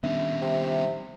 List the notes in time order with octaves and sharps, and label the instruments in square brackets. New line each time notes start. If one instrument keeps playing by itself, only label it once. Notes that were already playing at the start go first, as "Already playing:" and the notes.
[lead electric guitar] D#3 G3 [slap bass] B3 C#4 D4 [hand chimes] E5
[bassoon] C3